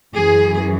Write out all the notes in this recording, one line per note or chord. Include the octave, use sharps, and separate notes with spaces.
F#2 E3 G#4